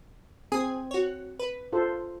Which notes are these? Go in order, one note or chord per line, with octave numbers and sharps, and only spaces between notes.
C4 G#4 G#5 D#6
F#4 C#5
B4
F4 A4 C5